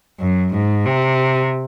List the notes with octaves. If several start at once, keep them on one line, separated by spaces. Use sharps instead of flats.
F#2
G#2
C3